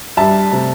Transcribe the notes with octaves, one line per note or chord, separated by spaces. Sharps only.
G2 G3 E5 A5
C3 A3